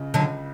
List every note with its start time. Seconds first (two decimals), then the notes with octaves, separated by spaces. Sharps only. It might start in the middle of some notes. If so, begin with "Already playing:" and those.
Already playing: C#2 C#3
0.14 C#2 D3 F#3